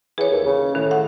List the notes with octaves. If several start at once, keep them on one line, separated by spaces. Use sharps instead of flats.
E3 G#4 C#5
D#2
C#3
A2 D#3
F#5